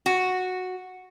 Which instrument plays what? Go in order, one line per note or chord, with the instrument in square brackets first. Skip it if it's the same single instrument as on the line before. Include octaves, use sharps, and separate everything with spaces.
[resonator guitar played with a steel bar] F#4